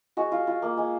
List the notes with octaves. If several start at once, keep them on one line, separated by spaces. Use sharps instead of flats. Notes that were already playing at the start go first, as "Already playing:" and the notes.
G#3 F#4
F4
F4
A#3
G#3